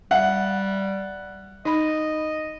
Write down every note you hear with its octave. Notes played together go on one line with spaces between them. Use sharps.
G3 E5 F#5
D#4 D#5 B5